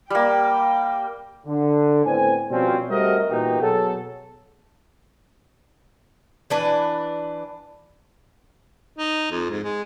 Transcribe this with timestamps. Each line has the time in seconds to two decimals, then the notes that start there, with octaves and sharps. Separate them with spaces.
0.10 G3 A#3 G5
1.47 D3
2.05 A2 B3 C4 G#5
2.51 B2 F3 G3 C4 C#4
2.90 G3 A3 C4 F#4 A#4 D#5
3.29 A#2 E3 B3 D#4 F#4 G4
3.61 B2 F#3 G#4 A4
6.50 E3 D4 B4
8.97 D#4
9.31 F2
9.50 G#2
9.63 G#3